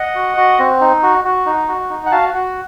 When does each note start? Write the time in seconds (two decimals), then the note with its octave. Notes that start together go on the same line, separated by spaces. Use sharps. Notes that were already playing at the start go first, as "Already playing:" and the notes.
Already playing: D#5 F#5
0.15 F#4
0.37 F#4
0.59 C4
0.81 D#4
1.03 F#4
1.24 F#4
1.46 D#4
1.68 F#4
1.90 D#4
2.06 F#5
2.12 F#4 F5 A5
2.34 F#4